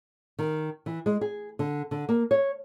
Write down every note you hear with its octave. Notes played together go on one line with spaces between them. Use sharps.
D#3
E3
G#3
G#4
D3
D3
A#3
C#5